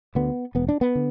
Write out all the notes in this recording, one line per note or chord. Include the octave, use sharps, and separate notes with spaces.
D2 D3 B3
E1 B3
D4
B3
D3